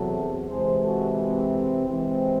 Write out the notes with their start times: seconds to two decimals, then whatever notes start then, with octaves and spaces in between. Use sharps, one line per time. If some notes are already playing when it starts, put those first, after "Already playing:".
Already playing: E2 C3 F#3 F#4 A4
0.50 C3 E3 G#3 G#4 C5
0.84 F#4 A4
1.18 C4
1.87 C3 E3 G#3 C4